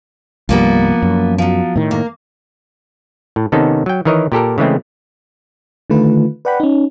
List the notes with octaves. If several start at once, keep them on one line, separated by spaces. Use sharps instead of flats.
C2 G2 F3 G3 A#3 B3
F#2
F3 F#3
A2 D#3
A#3
A2
C3 D#3 B3 C#4 D#4 A4
F#3 G5
D#3 E3 A#4 C#5 D#5
A#2 G4 A4 A#4
C#3 E3 G#3 A3 C4
D3 D#3 A3 F4 B4
B4 D5 F#5 G5 B5
C#4 D#4